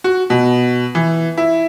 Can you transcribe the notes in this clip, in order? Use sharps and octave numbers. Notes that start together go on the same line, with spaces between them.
F#4
B2
E3
E4